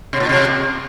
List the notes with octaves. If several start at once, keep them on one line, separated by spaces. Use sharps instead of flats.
C3
A#2
C3